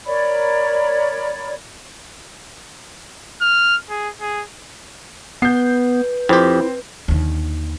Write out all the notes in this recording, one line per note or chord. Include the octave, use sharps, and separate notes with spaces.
A#4 C#5 D5 B5
F6
G#4
G#4
B3 B4 G6 C7
F2 C4 E4 G4 C5
D#2 D3